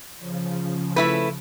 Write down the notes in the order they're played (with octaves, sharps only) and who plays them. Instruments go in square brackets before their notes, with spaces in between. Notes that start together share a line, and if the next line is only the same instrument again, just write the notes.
[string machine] C#3 F3
[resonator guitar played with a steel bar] A3 E4 B4